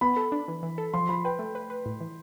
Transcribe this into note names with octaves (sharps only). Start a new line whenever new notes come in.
B3 B5
A4
D4
E3
E3
A4
F3 C6
F3 B5
B4 G5
A3
B4
B4
A2
E3